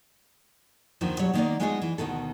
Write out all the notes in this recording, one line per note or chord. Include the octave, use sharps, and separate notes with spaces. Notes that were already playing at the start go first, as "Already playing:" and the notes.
D#2 D3 D#3 F3
B2 F#3 G3 C#5
D#3 G3 A#3 B3 D#4 D5
G#3 A3 B3 D#4 F4 G#4
E3
D2 B2 D#3 A4